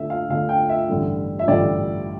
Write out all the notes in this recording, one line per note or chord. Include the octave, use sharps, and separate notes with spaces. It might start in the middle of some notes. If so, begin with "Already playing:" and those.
Already playing: D2 D3 A3 E5
F5
D2 D3 A3 F5
G5
E5
A1 G2 D3 G3
E5
A1 G2 D3 G3 D5